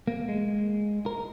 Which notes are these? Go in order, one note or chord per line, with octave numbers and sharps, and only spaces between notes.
A#3
G#3
A#4